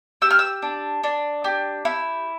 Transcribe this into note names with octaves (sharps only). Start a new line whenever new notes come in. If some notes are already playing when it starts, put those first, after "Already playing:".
G4 E6
F6
E6
D4
D4
G4
E4